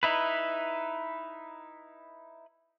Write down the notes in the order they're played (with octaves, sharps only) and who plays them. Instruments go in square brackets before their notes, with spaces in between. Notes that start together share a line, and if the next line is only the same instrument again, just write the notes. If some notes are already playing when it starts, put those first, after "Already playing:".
[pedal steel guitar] D#4 E4 B4